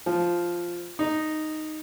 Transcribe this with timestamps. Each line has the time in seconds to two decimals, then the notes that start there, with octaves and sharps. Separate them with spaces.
0.06 F3
0.99 D#4